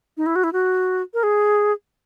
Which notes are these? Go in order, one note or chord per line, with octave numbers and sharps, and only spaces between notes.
D#4
E4
F#4
E4
F#4
A#4
G#4